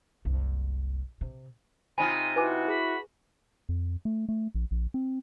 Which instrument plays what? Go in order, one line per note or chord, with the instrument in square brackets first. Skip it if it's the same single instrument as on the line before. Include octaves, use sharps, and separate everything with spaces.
[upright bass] F#1 C2
C3
[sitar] C3 D#4 F4 [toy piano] G#5 B5 [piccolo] D#7
[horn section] E4 F#4 [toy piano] B4 G#5 D6
[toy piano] G#4 [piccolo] B5
[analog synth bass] F2
A3
A3
A#1
A#1
C4